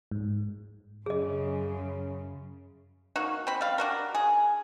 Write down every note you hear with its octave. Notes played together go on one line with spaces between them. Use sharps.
G#2
F#2 C#3 G#4 D#5
A#3 D#4 F#4
C4 B5
G3 F5
D4 F#4 A#4
G#4